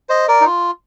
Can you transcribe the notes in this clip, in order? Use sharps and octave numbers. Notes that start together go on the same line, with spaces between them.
C5 D#5
A#4 D5
D#4
F4